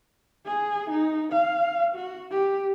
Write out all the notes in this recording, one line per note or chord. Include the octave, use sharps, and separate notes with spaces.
G#4
D#4
F5
F#4
G4